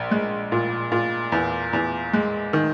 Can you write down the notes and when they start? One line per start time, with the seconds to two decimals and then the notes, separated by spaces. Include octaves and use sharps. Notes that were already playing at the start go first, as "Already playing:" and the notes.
Already playing: A#1
0.11 G#3
0.52 A#2
0.92 A#2
1.32 E2
1.73 E2
2.13 G#3
2.53 D#3